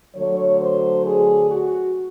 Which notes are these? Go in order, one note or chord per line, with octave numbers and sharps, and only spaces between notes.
D3 F#3 A3 C#5
C5
G#4
F#4